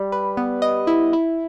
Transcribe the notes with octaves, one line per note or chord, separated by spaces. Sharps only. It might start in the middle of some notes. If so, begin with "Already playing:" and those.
Already playing: G3
B4
B3
D#5
E4
E4